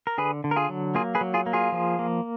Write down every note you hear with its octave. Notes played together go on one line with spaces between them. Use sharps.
A#4
D3 G#4 B4
D3
A#4
F4 G#4
F#3
A#3 F4 G#4
G#4 B4
F#3
F4 G#4
A#3
F4 G#4
F3
A#3